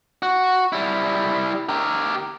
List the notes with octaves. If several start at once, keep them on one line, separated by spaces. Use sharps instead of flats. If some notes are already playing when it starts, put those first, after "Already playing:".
F#4
G3 E4
G4 A#4